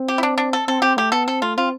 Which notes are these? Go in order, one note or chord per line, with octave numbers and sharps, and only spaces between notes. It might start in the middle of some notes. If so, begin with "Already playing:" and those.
Already playing: C4
G4
E4
D4
D4
A4
C4 A4
C4 G4
A3 G4
B3 A4
C4 A4
A3 F4
C4 F4